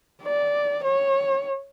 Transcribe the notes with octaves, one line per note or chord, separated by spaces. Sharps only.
D5
C#5